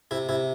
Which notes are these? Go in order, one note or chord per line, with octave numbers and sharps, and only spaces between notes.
C3 E4
C3 E4